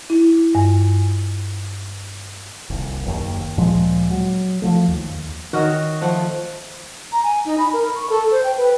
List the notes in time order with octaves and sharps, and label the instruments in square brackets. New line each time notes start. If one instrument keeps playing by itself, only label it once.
[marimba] E4
G2
[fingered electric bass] D#1 C2
F#1 D#2
D2 A#2 F3 G#3
F#3
F3 F#3 A3
D#2
[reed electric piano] D#3 D#5 [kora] F#4 A#4 C#5
[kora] F3 A3 F#5
[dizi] A#5
G#5
D#4
B5
A#4
C#6
A4
C5
G5
B4